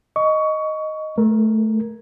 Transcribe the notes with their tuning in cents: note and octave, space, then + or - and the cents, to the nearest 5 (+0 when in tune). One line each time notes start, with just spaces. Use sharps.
D#5 +0 C#6 +20
A3 -10 A#4 +10